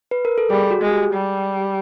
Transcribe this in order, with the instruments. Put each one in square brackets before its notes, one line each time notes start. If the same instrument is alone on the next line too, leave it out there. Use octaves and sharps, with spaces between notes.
[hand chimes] B4
A#4
A4
[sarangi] G3 [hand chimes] G#4
[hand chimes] F#4
[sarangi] G#3
[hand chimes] G4
[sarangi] G3